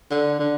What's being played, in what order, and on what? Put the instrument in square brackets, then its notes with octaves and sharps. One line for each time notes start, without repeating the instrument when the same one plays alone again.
[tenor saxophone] D3
D3